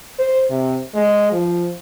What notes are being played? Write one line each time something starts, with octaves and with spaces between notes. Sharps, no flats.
C5
C3
G#3
F3